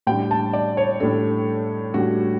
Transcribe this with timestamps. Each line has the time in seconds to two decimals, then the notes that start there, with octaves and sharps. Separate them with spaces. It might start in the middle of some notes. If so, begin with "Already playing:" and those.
0.07 A2 G3 D4 G5
0.31 A5
0.53 D5
0.77 C#5
1.00 A2 G3 D4 A4
1.94 A2 G3 D4 F#4